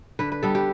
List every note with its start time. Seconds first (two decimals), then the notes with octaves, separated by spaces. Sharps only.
0.19 D3 B4
0.32 B4
0.43 G3 B3 D4 A4
0.55 G4